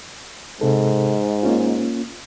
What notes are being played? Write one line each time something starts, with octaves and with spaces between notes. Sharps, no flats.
G#2 C3 A4
A#3 C#4 F4